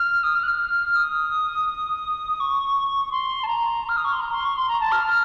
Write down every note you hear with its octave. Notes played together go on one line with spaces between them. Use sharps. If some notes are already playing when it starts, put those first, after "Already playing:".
Already playing: F6
D#6
F6
F#6
F6
D#6
C#6
C6
A5
A#5
F6
D#6
C#6
C6
A#5
C6
C#6
C6
A#5
A5
F6